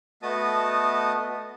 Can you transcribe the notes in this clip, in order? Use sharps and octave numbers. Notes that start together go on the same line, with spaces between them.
A3 B3 F#4 D#5 A5 D#6